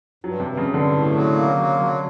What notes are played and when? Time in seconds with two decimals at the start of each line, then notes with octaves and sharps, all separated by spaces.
0.24 G2 F#3
0.40 C3
0.46 G2
0.57 C#3
0.68 G2
0.74 D3
0.91 A2
1.12 F#3
1.35 A#3
1.57 F#3
1.79 F#3